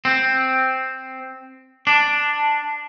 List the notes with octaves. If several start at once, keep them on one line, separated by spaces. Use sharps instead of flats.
C4
D4